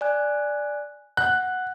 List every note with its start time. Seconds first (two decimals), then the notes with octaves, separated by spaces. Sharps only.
0.01 D5 G#5 F#6
1.17 F#5 F#6